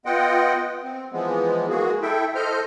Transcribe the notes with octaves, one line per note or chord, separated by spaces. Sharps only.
B3 F4 D#5 F#5 G5
C4
E3 F3 G#3 B3
G#3 A#3 F#4 G#4
E4 A4 E5 G5
A4 C5 D#5 F6 G6